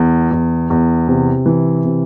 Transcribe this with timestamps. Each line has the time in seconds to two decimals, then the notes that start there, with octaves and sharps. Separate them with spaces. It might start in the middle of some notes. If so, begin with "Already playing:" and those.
Already playing: E2
0.31 E2
0.70 E2
1.08 C3
1.46 E3
1.84 C3